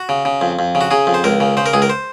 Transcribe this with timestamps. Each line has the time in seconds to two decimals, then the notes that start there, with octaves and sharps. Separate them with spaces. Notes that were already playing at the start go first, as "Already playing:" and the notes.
Already playing: F#4
0.09 C#3
0.25 C#3
0.41 F2
0.59 F2
0.75 C#3
0.81 F#4
0.91 C#3 G#4
1.07 F2
1.14 C5
1.24 C#2 A#4
1.40 C#3
1.57 C#3 C5
1.66 A#4
1.73 C#2 G#4
1.82 A#4
1.90 C5